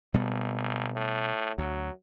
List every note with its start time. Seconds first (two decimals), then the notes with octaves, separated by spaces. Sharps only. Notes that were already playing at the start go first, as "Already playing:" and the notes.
0.14 G#1 B2 G3 B3
0.96 A2
1.58 D2 F#3